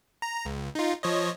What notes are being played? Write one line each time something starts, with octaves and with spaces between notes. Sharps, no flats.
A#5
C#2
D#4 F4
F3 C#5 D#5